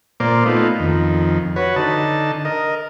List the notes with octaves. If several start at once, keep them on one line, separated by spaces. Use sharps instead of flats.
A#2 A#3 C5 D5
A3 B3 D#4 F4
F2 D#3
F#4 B4 C#5
D3 D#4 A5
A#4 D#5